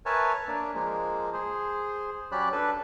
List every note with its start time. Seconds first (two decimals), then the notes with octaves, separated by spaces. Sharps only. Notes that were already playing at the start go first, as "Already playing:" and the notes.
0.06 A#4 B4 C#5 E5 G#5 A5
0.48 A#3 D4
0.75 F3 G#3 A#3
1.33 G#4 C5
2.32 F#3 C#4 G4 D5 B5 F#6
2.52 D4 A4 B4